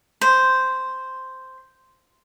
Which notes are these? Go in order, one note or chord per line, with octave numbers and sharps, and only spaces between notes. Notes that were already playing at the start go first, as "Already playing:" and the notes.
C5